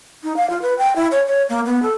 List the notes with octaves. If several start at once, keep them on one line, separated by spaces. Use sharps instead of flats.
D#4
F5
F4
B4
G5
E4
C#5
C#5
A#3
B3
A4